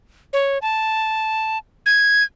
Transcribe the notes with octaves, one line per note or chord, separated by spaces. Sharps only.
C#5
A5
G#6